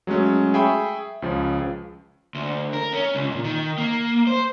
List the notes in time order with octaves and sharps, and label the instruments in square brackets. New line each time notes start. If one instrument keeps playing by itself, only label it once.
[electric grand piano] F#3 G#3 A3 C#4
G#4 E5 G5 B5 C#6
C#2 C#3 F3
[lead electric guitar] D2
A#4
C#4
C#2
A#2
D#3
A#3
C5